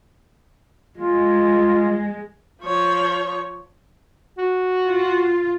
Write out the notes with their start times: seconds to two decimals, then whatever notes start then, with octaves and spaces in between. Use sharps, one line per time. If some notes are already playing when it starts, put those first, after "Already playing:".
0.98 G#3 F4
2.62 F3 C#5
4.38 F#4
4.89 F4